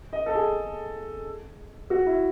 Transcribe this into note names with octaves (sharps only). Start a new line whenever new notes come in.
D#5
A4
G#4
F#4
E4